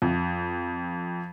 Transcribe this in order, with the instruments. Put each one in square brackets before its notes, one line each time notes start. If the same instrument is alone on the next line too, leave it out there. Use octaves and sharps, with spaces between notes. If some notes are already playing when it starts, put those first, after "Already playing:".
[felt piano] F2